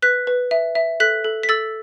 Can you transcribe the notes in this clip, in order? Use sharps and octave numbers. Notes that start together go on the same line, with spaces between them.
B4 F#6 B6
B4
E5
E5
A4 F#6 B6
A4
B6
A4 E6 A6